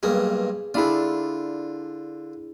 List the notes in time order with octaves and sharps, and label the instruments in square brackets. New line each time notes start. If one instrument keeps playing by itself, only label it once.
[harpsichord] B1 G2 A#3 [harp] G#4
[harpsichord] D3 F4 [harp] D4 E4 G#4